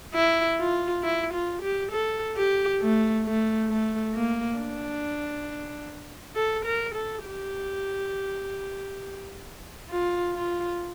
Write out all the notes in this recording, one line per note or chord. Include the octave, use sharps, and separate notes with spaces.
E4
F4
E4
F4
G4
A4
G4
A3
A3
A3
A#3
D4
A4
A#4
A4
G4
F4
F4